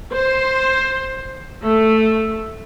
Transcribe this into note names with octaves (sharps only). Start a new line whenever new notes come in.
C5
A3